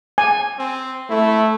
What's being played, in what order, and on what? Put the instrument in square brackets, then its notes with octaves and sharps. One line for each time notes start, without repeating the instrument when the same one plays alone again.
[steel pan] G#5
[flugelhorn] C4
[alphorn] A3 [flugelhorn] E4